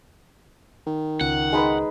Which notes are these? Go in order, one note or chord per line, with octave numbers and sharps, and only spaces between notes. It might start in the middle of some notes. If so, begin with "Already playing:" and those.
D#3
C#2 F#5
G#3 D#4 B4